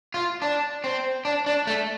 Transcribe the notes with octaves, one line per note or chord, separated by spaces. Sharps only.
F4
D4
C4
D4
D4
A3